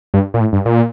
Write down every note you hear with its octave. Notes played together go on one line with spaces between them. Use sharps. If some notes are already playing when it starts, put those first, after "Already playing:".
G2
A#2
A2
G2
A#2